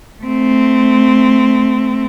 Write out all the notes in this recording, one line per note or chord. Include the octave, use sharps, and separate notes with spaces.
A3 C4